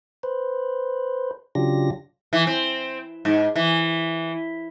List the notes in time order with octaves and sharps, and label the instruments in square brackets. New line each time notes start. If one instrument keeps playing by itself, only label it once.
[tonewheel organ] B4 C5
C#3 F#3 D4 F4 G4 A#6
[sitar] E3
C4
G#2
E3